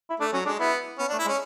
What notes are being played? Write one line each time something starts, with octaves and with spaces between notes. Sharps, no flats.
E4
A3 D4
F#3 C#4
G#3 D4
B3 E4
B3 C#4
D4
A3
E4
G#3
C#4